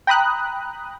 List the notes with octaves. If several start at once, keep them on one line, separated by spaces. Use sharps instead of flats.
G5 A#5 B5 D#6 F#6